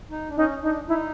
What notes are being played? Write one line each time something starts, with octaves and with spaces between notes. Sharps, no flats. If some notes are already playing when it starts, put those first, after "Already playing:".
D#4
D4
C#4 D#4
D4 D#4
D#4 E4